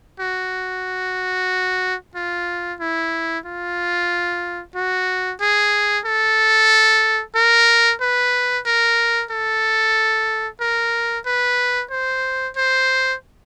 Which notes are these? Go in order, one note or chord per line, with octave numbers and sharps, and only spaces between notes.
F#4
F4
E4
F4
F#4
G#4
A4
A#4
B4
A#4
A4
A#4
B4
C5
C5